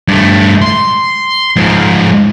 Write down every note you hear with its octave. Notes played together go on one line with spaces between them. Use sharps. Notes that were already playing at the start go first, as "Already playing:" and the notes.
G2 A3
C6
G#2 F3